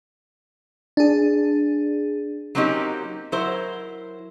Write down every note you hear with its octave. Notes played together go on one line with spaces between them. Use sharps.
D4 G#4
F#3 A#3 C4 C#4 D#4 G4
F#3 E4 A#4 C5